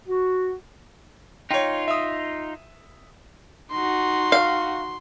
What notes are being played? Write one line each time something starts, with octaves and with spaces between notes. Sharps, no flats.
F#4
D#4 F4 C#5 G5
E5 D#6
D#4 F#4 C6
F5